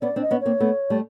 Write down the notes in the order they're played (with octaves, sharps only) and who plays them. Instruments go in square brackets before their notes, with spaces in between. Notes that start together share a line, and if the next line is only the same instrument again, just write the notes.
[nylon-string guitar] B3 C#4 [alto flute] D5
[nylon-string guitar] C4 D4
[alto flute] D#5
[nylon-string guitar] B3 C#4
[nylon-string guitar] A#3 C4 [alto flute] C#5
[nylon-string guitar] A3 B3
G3 A3